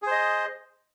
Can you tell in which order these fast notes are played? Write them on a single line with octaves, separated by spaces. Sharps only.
G#4 C5 D#5